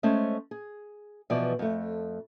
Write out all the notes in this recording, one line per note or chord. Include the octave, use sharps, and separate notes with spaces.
G#3 A3 C#4 C5
G#4
B2 E3 F3 B3 D5
F2 A3